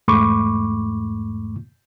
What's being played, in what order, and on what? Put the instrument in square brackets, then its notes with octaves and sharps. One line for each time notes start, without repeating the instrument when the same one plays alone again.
[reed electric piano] E2 G#2 A3 B5 C#6 D6